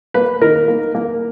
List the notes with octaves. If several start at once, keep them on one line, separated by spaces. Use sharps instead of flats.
A#3 B4
D#3 A#4
A#3
A#3